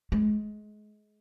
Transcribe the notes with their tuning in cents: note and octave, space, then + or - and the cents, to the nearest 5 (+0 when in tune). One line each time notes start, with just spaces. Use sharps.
G#3 +25